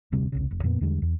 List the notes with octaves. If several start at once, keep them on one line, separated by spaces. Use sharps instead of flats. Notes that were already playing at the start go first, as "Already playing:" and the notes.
F1 D2 C3 G3
E1 C2 C#3
F1
F2 A#2 A#3 B3
E2 D3 G3 G#3
E2